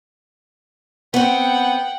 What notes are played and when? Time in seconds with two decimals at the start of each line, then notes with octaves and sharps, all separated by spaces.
1.14 B3 C4 F#5 G5